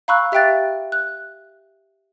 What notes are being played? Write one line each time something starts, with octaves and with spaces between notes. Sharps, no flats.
F5 A#5 B5 C#6 E6 F#6
G4 E5 F5 G5 F#6 A6
F#6